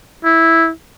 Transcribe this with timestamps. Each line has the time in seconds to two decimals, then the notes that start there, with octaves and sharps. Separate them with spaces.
0.24 E4